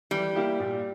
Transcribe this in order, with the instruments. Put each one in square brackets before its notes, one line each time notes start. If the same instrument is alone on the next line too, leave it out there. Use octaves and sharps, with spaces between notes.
[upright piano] E3 [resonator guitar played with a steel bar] G3
[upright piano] A#3 E4 G4
A#2